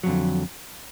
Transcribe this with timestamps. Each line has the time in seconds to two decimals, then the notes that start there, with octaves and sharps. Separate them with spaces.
0.03 F#3
0.06 F2
0.09 D3